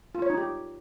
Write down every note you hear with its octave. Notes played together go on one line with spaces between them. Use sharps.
F4
C#5
D#4
G4